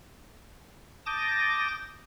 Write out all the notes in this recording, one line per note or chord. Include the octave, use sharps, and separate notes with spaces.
A5 D6 D#6 G6 A6 A#6